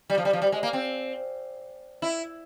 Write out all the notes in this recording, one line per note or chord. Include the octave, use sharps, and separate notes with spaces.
G3
F3
G3
F3
G3
G#3
A#3
C4
E4